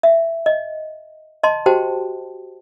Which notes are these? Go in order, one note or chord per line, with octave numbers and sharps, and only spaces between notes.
E5
D#5
D#5 A5 C6
F#4 G4 C5 G5 A5